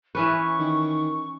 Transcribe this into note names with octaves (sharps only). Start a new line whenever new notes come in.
E3 C#4 B4 C#6
D#3